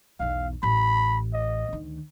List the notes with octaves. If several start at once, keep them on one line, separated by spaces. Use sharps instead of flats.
B1 E2 F5
A1 B5
D#5
D2 D#3